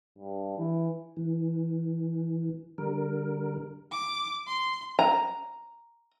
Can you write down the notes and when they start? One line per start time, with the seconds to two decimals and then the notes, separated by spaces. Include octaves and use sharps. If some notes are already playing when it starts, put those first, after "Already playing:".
0.18 G2
0.57 E3
1.17 E3
2.78 D3 G3 A#4
3.92 D6
4.47 C6
4.99 A#5